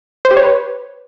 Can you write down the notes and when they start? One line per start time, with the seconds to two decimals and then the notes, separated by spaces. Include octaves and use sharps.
0.25 C5
0.31 G4
0.37 C#5
0.43 B4